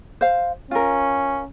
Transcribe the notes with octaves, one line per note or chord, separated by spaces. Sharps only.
C5 F5
C#4 F4 A#4